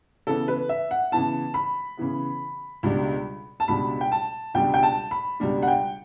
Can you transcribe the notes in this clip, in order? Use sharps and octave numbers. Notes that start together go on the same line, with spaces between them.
C#3 E3 B3 A4
B4
E5
F#5
C#3 E3 B3 A5
B5
C#3 E3 B3
C#2 B2 G3 D4
A5
C#2 B2 G3 D4 B5
G5
A5
C#2 B2 G3 D4 G5
G5
A5
B5
C#2 B2 G3 D4
F#5
G5